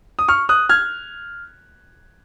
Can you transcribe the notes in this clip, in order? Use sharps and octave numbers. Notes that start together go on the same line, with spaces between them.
D#6
C#6 F6
D#6 F#6
F6 G#6